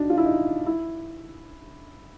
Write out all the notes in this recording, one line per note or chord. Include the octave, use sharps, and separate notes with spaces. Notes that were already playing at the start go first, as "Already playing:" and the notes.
Already playing: D4 D#4 F#4
F4
E4
D#4
E4